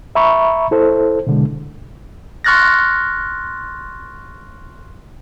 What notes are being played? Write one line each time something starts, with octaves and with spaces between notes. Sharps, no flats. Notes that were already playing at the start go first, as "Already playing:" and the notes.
E5 A#5 B5 C#6
E4 A4 C5
B2 D3 G#3
C6 C#6 F6 F#6 A6 A#6